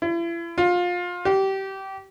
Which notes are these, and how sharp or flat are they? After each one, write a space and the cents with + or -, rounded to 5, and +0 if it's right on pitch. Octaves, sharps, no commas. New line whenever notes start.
E4 +40
F4 +25
G4 -20